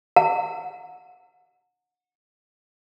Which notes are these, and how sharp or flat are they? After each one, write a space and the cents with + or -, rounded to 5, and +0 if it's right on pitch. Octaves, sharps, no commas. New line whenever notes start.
F#5 -30 A#5 -45